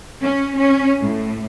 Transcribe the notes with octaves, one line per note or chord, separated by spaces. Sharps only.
C#4
C#4
A2